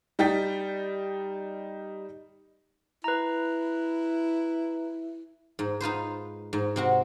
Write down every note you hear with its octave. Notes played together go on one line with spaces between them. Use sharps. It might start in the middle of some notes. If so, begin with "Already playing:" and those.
G3 D#4 G5 A6 B6
E4 B4 A#5
G#2
D#4 F4 B4 C5
G#2
C3 C4 F#4